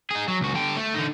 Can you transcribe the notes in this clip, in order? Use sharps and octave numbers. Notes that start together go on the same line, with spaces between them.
D#4 G#4
F#3
C#2 F#4
D3 G4
A3
D3 D#4